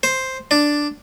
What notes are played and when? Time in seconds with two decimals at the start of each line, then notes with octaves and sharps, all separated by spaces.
0.03 C5
0.51 D4